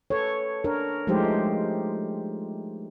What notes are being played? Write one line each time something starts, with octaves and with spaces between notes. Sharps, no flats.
A4 B4 C#5
D4 A#4 C#5
F3 G#3 A3 D#4 G4 C5